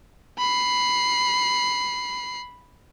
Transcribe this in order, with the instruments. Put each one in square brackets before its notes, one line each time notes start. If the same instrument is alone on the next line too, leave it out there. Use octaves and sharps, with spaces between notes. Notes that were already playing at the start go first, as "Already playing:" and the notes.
[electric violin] B5 C7